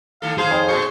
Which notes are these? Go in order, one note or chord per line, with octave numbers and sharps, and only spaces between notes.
D#3 A3 A4 F5
D#2 G#4 C5 F5
F2
A2 C#6